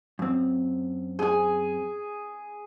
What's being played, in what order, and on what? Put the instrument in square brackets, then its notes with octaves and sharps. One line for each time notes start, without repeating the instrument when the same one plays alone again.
[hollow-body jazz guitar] F#2 C4
[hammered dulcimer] G#4 G#5